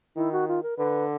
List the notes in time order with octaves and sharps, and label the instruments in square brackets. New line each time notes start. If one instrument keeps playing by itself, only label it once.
[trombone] D#3 [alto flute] E4
[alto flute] F#4
F4
A#4
[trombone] D3 [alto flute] B4